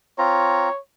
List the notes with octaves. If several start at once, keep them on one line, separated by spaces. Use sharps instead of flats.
C4 F4 C#5 A#5